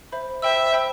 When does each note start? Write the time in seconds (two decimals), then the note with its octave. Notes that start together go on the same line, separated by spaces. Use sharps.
0.12 C5 E5 B5
0.42 C5 E5 G5 B5 E6
0.73 C5 G5 B5 E6